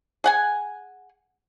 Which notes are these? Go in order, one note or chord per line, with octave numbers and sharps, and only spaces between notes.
G#4 F#5 G#5